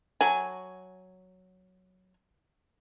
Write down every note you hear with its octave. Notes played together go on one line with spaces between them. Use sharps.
F#3 G#5